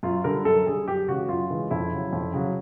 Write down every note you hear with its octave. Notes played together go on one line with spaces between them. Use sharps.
F#2 F4
D3 G3 A#4
F#2 A4
D3 G3 G#4
F#2 G4
C#3 E3 G#3 F#4
F#2 F4
C#3 E3 G#3
F2 E4
C#3 F#3
F2
C#3 F#3